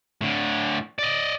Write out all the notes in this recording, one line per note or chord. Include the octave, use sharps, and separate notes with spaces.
A2 D3
D5 D#5